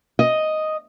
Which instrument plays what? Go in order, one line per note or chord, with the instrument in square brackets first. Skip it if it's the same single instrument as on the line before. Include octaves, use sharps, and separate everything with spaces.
[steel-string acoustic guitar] D#5